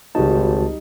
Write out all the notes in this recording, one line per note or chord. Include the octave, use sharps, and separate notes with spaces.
G#1 C#2 G3 D#4 F#4 A5